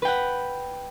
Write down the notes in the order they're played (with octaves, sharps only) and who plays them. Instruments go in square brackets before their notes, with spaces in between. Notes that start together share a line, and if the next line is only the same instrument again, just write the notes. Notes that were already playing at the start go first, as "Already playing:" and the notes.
[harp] B4
G5
F#5